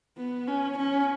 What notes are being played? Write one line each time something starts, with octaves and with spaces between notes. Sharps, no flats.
B3
C#4
C#4